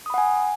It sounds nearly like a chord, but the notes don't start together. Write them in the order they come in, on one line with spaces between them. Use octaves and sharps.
D#6 B5 F#5 G#5